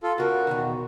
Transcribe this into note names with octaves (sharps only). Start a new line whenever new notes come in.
F4 A4
C#3 F#4 A#4
E2 B2 D#3